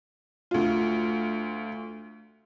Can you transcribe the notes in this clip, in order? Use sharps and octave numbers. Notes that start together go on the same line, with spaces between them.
D2 F4